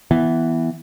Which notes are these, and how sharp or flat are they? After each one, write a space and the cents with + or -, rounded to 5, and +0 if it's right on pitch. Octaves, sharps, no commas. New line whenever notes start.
E3 +0 B3 +0